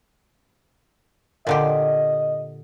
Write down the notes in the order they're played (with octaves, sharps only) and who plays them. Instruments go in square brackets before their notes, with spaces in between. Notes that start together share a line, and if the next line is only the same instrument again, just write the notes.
[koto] A#2 D3 G4 [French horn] D#5